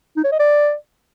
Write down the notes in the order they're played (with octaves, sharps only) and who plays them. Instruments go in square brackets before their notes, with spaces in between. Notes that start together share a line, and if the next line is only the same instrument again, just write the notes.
[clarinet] D#4
C#5
D#5
D5